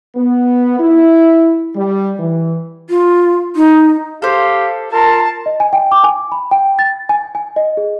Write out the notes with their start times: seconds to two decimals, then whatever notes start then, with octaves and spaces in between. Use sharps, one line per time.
0.16 B3
0.80 E4
1.76 G3
2.20 E3
2.90 F4
3.56 D#4
4.22 G4 A4 C5 F5
4.93 F4 A#4 A5
5.46 D#5
5.60 G#5
5.73 G5
5.92 D6
6.04 G#5
6.32 B5
6.51 G5
6.79 A6
7.09 G#5
7.35 G#5
7.56 D#5
7.77 G#4